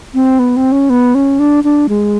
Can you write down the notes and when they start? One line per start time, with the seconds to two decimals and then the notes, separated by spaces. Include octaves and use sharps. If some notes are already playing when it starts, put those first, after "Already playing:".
0.14 C4
0.39 B3
0.57 C4
0.72 C#4
0.90 B3
1.15 C#4
1.39 D4
1.64 D4
1.89 G#3